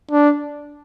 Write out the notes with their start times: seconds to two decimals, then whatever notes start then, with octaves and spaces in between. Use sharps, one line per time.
0.11 D4